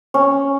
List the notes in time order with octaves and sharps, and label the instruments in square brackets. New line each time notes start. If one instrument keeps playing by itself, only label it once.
[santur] C#4